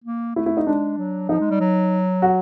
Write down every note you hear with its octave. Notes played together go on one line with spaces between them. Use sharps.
A#3
A3 E4
E4
D#4
G#3 D4
F#3
F3 D#4
G#3
G3
F#3
F#4